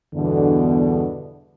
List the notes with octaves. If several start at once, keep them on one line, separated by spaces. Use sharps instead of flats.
E2 G2 B2 D3